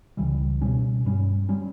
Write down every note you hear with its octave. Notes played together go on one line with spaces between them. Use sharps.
C#2 C#3 E3 G3
B2 G3 C#4
G2 G3 C#4
G3 C#4